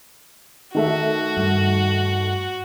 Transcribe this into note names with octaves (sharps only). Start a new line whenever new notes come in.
D#3 A3 F#4 E5
G2